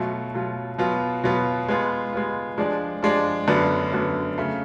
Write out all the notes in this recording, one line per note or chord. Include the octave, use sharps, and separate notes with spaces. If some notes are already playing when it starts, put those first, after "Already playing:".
Already playing: B2 F#3 A3 F4
B2 F#3 A3 F4
B2 F#3 B3 F4
B2 F#3 B3 F4
G#3 B3 F4
G#3 B3 F4
F3 G#3 D4 G#4 D5
F3 G#3 D4 G#4 D5
F#2 D3 F#3 B3 D4
F#2 D3 F#3 B3 D4
C#3 F#3 A3